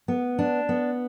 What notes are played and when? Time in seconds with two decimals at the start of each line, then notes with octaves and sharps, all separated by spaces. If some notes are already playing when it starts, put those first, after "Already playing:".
0.08 B3
0.39 D4
0.69 B3